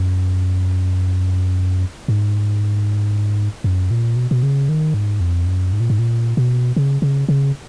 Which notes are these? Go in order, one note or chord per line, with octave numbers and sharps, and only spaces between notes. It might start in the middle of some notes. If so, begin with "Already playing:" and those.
Already playing: F#2
G#2
F#2
A#2
B2
B2
C#3
D#3
G#2
F2
F#2
G#2
A#2
G#2
A#2
B2
C#3
C#3
C#3